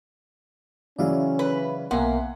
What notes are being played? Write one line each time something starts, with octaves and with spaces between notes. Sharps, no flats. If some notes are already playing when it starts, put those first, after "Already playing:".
C#3 E3 F#3 C#4 D5 E5 F5
B4
B1 C3 A#3 B3 F#5 G#5 C6